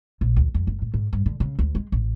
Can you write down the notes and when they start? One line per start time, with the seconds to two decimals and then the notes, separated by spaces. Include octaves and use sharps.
0.21 A#1
0.36 D2
0.54 F2
0.67 F#1
0.82 A2
0.94 G#2
1.13 G2
1.26 D3
1.40 C#3
1.59 D2
1.75 G#3
1.92 A1